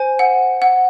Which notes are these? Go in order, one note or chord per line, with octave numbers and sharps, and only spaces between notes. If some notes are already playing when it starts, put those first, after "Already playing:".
Already playing: C5 G#5
F#5
F#5